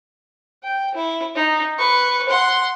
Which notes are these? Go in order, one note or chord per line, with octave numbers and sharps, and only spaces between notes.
G5
E4
D#4
B4 C#6
F#5 C6